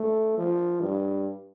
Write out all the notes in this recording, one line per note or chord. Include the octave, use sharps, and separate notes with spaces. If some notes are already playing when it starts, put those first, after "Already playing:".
Already playing: A3
F3
G2